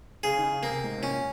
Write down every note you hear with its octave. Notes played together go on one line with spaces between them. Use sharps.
C#3 G#4
D#3
C#3
C3 A#3
G#2
C3
A#2 C#4